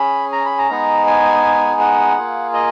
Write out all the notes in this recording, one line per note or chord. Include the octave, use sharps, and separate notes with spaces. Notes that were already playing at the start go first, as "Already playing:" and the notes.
Already playing: C#4 G#4 B5
A#5
B5
A#5
G#3 B3 D#4 G#4
G#5
F#5
A#3 F4 G#4
D#5